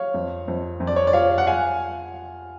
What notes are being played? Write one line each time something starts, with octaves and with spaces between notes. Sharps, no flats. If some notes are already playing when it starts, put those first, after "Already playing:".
Already playing: C#5 F5
F2
F2
F2
D5
C#5
D5
F3 C#5 F5
F#5
F5 G#5